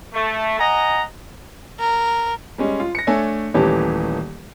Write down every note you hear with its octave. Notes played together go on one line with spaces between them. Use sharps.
A3
D#5 F#5 G#5 A#5
A#4
G3 G#3 C#4
F4
A#6 C#7
A3 D4 A4 C#5 G#5
D#1 E3 A3 C#4 G4 A5